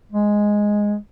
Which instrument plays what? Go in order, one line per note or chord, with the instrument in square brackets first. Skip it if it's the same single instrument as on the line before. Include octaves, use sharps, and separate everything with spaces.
[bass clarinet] G#3